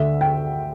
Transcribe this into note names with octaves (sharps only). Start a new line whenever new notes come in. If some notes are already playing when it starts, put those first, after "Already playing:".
Already playing: D2 D3 E5
G5